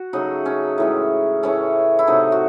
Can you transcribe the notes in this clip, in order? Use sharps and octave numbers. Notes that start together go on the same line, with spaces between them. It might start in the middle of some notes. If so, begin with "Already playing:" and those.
Already playing: F#4
C#3 F#3 A3 D#4
C#4
A2 E3 G#3
A2 E3 A3 C#4
E4
C3 F#3 A3 D#4
F#4